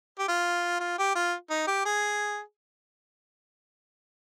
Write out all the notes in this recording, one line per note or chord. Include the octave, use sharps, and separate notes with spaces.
G4
F4
F4
G4
F4
D#4
G4
G#4